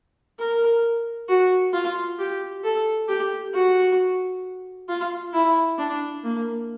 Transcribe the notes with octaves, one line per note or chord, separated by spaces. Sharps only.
A#4
F#4
F4
G4
A4
G4
F#4
F4
E4
D4
A#3